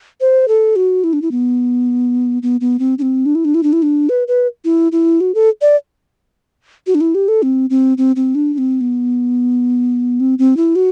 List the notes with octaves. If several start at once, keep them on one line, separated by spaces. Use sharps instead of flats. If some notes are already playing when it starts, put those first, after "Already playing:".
C5
A4
F#4
E4
D4
E4
B3
B3
B3
C4
D4
C4
D4
E4
D4
E4
D4
E4
D4
B4
B4
E4
E4
F#4
A4
D5
F#4
D4
E4
G4
A4
C4
C4
C4
C4
D4
D4
C4
B3
C4
C4
E4
F#4